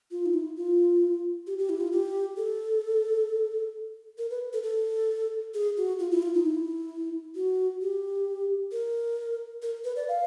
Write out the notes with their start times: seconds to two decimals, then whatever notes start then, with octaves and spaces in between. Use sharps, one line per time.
0.11 F4
0.26 D#4
0.34 E4
0.56 F4
1.47 G4
1.58 G4
1.69 E4
1.81 F4
1.92 G4
2.37 A4
4.18 A#4
4.30 B4
4.53 A4
4.63 A4
5.54 G#4
5.77 F#4
5.99 F4
6.12 E4
6.23 F4
6.34 D#4
6.46 E4
7.35 F#4
7.82 G4
8.72 A#4
9.62 A#4
9.85 B4
9.96 D5
10.08 F5